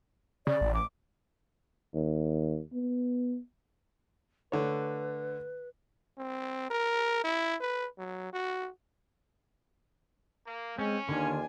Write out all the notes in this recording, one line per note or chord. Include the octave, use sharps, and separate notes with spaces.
C#3 D5
A1
D6
D#2
B3
D3 A3 B4 C#5
C4
A#4
E4
B4
F#3
F#4
A#3
G#3 C4 C#4
D#2 D3 D#3 D4 F4 G#5